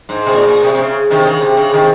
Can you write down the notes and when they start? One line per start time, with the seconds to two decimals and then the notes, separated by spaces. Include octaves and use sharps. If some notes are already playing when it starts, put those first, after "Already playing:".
0.09 G#2
0.26 C3
0.32 A#2
0.47 A#2
0.63 C3
0.74 C3
0.79 C#3
1.10 C3 D#3
1.26 C#3
1.42 C3
1.57 C#3
1.73 C3 D#3